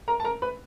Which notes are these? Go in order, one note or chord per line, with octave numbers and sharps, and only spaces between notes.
A#4 A#5
A5
A#4 A#5
B4 B5